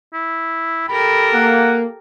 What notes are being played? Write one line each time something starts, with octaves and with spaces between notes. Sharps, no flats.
E4
G4 A4 A#4 B5
A#3 F#5